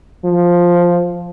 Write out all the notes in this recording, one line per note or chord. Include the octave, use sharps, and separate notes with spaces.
F3